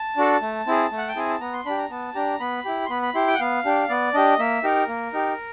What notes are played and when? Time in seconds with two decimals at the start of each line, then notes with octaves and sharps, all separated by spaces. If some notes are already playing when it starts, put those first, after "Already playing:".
Already playing: A5
0.17 D4 F#4 A4
0.41 A3
0.67 C4 E4 G#4
0.92 A3
0.98 F#5
1.08 G5
1.16 C4 E4 G#4 G#5
1.30 A5
1.41 B3 A#5
1.53 C6
1.66 D4 G4 B5
1.78 A#5
1.90 B3 A5
2.15 D4 G4 A#5
2.40 B3 B5
2.65 E4 G4
2.86 C6
2.90 B3 B5
3.02 B5
3.15 E4 G4 C6
3.27 G5
3.34 F#5
3.40 B3 F5
3.65 D4 G4
3.89 B3 D5
4.14 D4 G4 D#5
4.39 A#3 E5
4.63 D#4 G4 A#4
4.88 A#3
5.13 D#4 G4